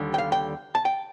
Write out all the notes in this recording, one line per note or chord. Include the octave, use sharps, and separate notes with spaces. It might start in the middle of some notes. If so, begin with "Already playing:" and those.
Already playing: D#2 D3 G3
G5
F5
G5
A5
G5